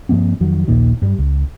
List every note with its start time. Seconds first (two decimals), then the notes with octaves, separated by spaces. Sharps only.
0.09 G2 F3 A#3 C4
0.40 F2 D#3 F#3
0.68 A#1 D#2 A#2 D#3
1.02 G2 G3
1.19 C#2